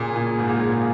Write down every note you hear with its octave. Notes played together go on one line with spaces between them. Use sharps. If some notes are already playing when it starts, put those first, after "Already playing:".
Already playing: A#2 C#3 A#3 F4 G#4
A#2
G#2
A#2
G#2